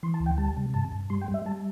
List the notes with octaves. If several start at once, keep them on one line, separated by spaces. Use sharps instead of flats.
E3 C6
A5
D2
G5
G3 A5
C3
G2 A5
G2
G3 C6
G5
G3
E5
G3 A5